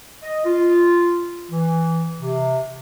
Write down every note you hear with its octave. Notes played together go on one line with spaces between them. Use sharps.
D#5
F4
E3
C3